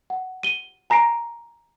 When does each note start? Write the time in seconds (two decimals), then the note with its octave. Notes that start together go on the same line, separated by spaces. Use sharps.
0.10 F#5
0.43 D#7 G7
0.90 G#5 A#5 A#6 C7 D7